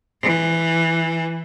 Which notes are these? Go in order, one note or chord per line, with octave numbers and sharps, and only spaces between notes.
E3